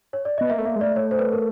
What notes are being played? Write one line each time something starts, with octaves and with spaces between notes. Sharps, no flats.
C#5
D5
B3 D#5
A#3 E5
A3
A#3 E5
G#3
A3 D5
C#5
C5
B4
A#4